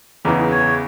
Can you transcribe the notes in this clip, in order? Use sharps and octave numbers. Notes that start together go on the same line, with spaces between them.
E2 C#3 E3 D#4
C#5